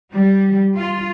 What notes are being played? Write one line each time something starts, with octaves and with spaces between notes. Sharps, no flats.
G3
F4